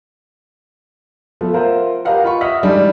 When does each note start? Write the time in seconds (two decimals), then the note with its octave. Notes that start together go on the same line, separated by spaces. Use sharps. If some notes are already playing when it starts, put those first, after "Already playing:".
1.41 F3 A3 B3
1.53 F4 A#4 C5 E5 F#5
2.05 G4 A#4 B4 D#5 F5 F#5
2.24 F4 B5 C#6
2.41 D#5 E5 F#5 D#6 F6 B6
2.63 E3 G3 G#3 D4 D#4